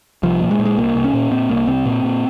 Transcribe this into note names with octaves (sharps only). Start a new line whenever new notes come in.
C2 F3
A#2
G#3
A#2
G#3
C2 A#3
C2
C#4
A#2
A#2 C4
C2 A#3
C2 C4
A#2
A#2